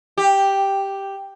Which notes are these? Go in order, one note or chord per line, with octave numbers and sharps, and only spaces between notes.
G4